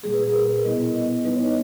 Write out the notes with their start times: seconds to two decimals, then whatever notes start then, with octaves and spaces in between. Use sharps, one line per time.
0.03 A#2 G3 A#3 G#4
0.14 B4
0.23 G#4
0.34 A#4
0.49 B4
0.63 B2 G3 B3 E4 D#5
0.94 D#5
1.25 G3 B3 D#4 B4
1.35 C#5
1.45 D#5